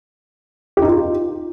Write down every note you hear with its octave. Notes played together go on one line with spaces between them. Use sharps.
G4
D#4
F4